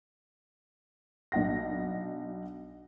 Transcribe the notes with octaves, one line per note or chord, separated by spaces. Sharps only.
B1 D4 F#5 A#6